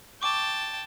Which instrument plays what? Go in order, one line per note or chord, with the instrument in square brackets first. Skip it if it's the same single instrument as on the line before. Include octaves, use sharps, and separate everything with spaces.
[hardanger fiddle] G5 A5 [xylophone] C#6 D6